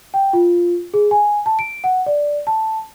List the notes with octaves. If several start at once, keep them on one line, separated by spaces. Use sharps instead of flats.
G5
F4
G#4
G#5
A5
D7
F#5
D5
A5